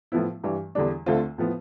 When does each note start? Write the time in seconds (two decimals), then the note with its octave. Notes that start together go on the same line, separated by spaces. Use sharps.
0.12 A2 F3 B3 E4
0.43 G2 E3 G3
0.75 E2 D3 G3 D4
1.06 D2 D3 A3 C4 F4
1.38 A2 F3 B3